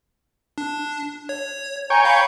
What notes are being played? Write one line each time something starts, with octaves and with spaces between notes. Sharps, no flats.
D4
C#5
C#5 G5 G#5 A#5
F5 B5